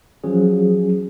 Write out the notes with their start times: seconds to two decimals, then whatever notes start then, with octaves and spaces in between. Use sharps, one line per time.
0.24 F3 F#3 C#4 G#4